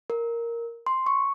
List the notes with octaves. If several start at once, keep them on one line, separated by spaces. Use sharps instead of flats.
A#4
C6
C#6